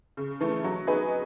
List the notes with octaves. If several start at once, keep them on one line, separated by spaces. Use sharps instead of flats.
C#3
E3 A3
F#3
B3 D#4 G#4 B4